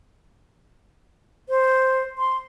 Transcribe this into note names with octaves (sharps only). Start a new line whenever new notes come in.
C5
C6